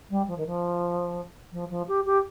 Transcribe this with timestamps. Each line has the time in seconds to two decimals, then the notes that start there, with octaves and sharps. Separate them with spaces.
0.10 G3
0.28 F3
0.38 D#3
0.47 F3
1.52 F3
1.70 F3
1.88 G4
2.06 G4